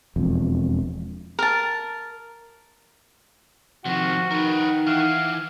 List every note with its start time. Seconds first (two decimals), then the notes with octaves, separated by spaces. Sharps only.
0.16 E1 F2
1.39 A#4 A5
3.86 C3 D#3 F3 F#4 F#5
4.31 D#3 A#4 B4
4.87 E3 F5